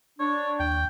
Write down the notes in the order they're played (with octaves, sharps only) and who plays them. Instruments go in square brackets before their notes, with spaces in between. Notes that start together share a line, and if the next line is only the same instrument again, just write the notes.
[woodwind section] D4 [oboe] C#5
[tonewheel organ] D#2 [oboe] G5